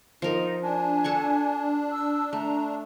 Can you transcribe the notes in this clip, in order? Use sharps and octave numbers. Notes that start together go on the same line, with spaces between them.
F3 D#4 A#4
D4 G#5
A4 F#5 C#6
E6
A3 A#5